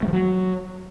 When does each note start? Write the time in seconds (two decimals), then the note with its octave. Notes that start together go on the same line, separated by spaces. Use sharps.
0.03 A3
0.08 F3
0.13 F#3